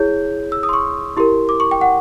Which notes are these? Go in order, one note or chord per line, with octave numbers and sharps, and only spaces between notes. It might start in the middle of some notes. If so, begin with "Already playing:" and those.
Already playing: E4 G#4 C#5 G6
E6
D#6
C6
C#6
E4 G4 A#4 C6
D6
C#6
G5
F#5